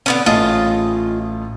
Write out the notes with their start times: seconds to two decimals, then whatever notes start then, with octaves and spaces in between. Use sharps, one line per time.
0.06 D3 B3 C#4
0.26 A1 A2 F4 G#4 D#5 A5